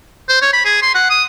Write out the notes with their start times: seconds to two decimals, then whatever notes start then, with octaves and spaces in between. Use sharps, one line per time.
0.29 C5
0.42 C#5
0.53 B5
0.65 G#4
0.82 C6
0.95 F#5
1.10 D#6